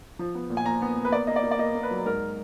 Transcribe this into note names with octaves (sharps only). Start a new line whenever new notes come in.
F3
B3
A#2
G#5
A#2 A#5
B3
B3
B4
A#3 D5
A#3 D#5
D5
A#3
D5
A#3 D#5
A#3
B4
F#3
G#2 A#4